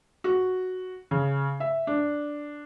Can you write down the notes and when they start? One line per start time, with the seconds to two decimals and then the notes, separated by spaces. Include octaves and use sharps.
0.24 F#4
1.11 C#3
1.60 E5
1.87 D4